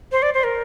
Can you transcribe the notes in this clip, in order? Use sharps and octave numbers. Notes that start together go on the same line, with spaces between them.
C5
D5
C5
A#4